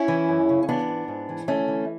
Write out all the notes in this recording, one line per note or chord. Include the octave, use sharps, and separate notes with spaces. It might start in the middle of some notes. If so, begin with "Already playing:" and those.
Already playing: C#4 E4
E3
F#2
C#3
C#4
E3 B3 D4
G#2
G#2
E3
D2 A3 C#4
E3